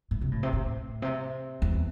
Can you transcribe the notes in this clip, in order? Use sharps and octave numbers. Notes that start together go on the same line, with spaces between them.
A2
C3
A2
C3
A2
C3
E2